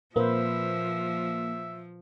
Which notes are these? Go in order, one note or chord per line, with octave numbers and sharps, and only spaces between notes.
A#2 F3 A#3 B4 C5 E5